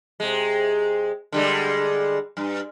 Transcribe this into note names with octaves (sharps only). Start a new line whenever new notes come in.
C3 G#3
D3 G3 G#3
G2